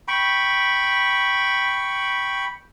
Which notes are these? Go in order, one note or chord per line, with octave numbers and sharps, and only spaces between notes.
G5 B5 C#6